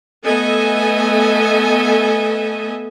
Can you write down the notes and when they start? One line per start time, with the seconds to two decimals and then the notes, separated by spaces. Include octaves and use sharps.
0.24 A3 B3 A4 D#5 E5 G#5